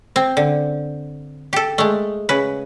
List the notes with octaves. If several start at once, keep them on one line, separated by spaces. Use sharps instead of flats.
C4
D3
G4 A4
G#3 A3
C#3 B4